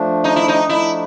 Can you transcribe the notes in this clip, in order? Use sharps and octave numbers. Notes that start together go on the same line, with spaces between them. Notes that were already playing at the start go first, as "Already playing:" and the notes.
Already playing: F3 A3 D4
D#4
E4
D#4
F3 A3 D4 E4